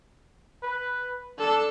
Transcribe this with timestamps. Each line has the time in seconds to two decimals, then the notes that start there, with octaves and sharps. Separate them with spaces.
0.63 B4
1.39 D4 A4